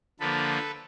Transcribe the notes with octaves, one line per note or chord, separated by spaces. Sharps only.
D3 F3 A#3 A4 B4